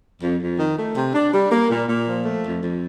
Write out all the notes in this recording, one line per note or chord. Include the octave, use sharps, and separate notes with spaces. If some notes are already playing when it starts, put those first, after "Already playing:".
F2
F2
D#3
A3
C3
D4
G3
A#3
A#2
A#2
F3
A3
F2
F2